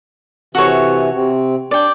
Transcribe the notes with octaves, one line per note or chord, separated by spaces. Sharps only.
C3 E3 F#4 A4 C#5
C3 C4
D4 D5 G5